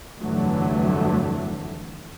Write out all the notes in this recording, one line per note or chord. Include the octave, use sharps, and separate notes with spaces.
F1 G2 D3 E3 F#3 A3